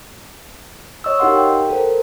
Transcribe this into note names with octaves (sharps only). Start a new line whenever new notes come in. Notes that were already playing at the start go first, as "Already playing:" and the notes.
C#5 D#5 C#6 E6
D#4 G4 A#4 F5 F#5 C6
G5
A4 A#4 C5